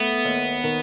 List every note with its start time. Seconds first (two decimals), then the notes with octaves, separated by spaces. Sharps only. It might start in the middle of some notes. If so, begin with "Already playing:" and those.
Already playing: A3 B3
0.25 D#2
0.64 D#3